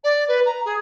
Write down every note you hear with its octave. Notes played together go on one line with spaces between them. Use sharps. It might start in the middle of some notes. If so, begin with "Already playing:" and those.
D5
B4
A#5
G#4